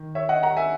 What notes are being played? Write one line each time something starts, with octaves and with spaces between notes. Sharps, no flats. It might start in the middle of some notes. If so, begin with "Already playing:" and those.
Already playing: D#3
C#5 E5
D#5 F#5
F#5 A#5
E5 G#5